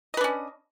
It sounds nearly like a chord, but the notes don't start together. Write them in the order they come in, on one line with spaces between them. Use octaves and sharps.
D#5 B4 D4 C#4